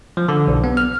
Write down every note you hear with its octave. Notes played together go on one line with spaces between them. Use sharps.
F3
D3
B1
B3
F6